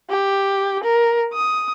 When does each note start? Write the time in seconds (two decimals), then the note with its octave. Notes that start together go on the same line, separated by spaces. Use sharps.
0.10 G4
0.83 A#4
1.33 D#6